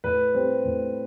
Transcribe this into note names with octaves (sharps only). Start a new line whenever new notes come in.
A2 B4
G3 C4
A2